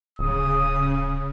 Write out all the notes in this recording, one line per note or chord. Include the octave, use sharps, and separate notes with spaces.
D1 C#3 D#6